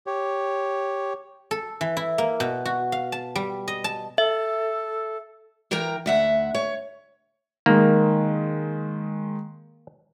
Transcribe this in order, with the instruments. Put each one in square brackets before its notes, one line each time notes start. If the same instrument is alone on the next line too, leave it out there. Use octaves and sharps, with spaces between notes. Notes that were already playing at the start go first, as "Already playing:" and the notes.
[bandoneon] G4 C#5
[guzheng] A4
E3
E4
A#3
B2
F#4
F5
A5
G3
D#5
A5
[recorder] A4 [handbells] E5
[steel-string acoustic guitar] E3 A#4 G5 A#5
D2 E5 F#5
C#5
[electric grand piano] D#3 G#3 [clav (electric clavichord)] A#3